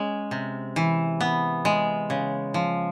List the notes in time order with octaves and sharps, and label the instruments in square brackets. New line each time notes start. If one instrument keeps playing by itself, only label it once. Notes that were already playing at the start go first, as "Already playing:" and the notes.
Already playing: [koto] G#3 C#4
C3
E3
B3
G#3
C#3
F3